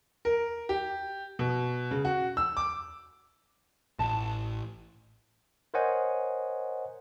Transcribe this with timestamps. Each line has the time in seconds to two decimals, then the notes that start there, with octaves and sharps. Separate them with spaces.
0.25 A#4
0.69 G4
1.39 B2
1.91 C#3
2.05 F#4
2.37 E6
2.57 D6
3.99 A1 A5
5.74 A#4 C5 C#5 D#5 F#5 G#5